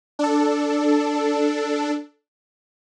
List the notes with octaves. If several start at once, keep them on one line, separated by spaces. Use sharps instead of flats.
D4 A4